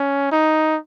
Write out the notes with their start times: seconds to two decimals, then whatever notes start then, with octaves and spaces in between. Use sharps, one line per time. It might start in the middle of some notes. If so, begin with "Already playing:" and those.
Already playing: C#4
0.32 D#4